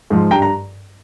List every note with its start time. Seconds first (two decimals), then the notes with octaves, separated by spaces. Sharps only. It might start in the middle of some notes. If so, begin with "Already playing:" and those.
0.10 G#2 F3
0.31 G2 G5 A#5
0.42 A#5